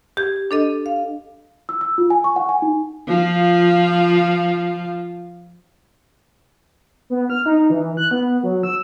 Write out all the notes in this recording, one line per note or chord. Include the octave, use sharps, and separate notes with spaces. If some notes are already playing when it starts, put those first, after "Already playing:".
G4 G6 G#6
D4 A4 D#5
F5
E6
E6
F4
G#5
C#6
F#5
G#5
D#4
F3 F4
B3
F6
D#4
E3
F#6
B3
F#3
E6